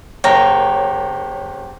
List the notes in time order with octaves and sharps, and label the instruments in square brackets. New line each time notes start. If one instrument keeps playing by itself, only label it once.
[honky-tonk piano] F#1 C#5 A5 [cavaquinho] G4 A#4